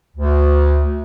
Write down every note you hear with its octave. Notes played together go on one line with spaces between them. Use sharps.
D2